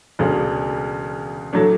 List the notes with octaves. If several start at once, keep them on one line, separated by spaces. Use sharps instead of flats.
E1 D2 C#3
A2 F#3 A3 D4